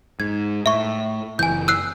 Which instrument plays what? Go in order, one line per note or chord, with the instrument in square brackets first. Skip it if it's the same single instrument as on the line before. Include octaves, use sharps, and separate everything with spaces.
[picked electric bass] G#2 [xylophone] G#6
[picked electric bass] A2 [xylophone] E5 C#6
[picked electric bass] F#1 E3 [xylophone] G#5 G6
[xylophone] E6 F#6 C7